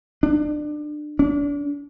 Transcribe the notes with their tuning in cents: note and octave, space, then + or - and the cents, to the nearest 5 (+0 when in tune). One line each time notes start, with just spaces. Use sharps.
D4 +25
D4 -35